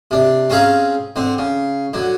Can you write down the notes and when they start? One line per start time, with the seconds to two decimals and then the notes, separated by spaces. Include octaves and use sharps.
0.11 C3 D4
0.50 C4 C#4 G#4 F5 A#5
1.16 D3 C4
1.38 C#3
1.93 D3 F#3